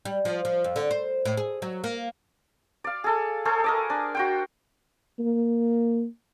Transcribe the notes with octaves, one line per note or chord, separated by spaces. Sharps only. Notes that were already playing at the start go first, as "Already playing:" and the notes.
G3
F3
F3
F2
D3
C5
A2
G#4
F#3
A#3
D5 F5
G#4 A4
G#4 A4 C5 C#5
A#4 D#5 D6
D4
F#4 C5 G5
A#3